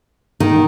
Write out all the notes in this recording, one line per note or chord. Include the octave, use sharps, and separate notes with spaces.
D#3